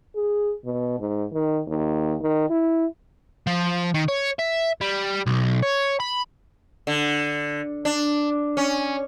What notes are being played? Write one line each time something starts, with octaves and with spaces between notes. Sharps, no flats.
G#4
B2
G#2
D#3
D#2
D#3
E4
F3
D#3
C#5
E5
G3
B1
C#5
B5
D3
D4
C#4